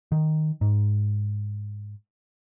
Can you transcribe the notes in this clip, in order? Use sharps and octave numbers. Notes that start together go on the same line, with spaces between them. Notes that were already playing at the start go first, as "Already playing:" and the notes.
D#3
G#2